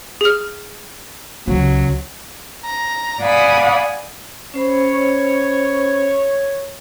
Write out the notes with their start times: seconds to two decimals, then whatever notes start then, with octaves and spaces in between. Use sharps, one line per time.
0.21 G#4 F6
1.48 C#2 F#3
2.64 A#5
3.21 D5 F5 F#5 G#5 B5 D#6
4.54 C#4 C5 C#5 B5